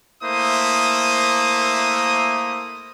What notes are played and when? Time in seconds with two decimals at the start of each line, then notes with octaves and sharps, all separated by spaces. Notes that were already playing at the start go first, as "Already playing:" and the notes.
0.23 A3 A#3 E4 C5 D#6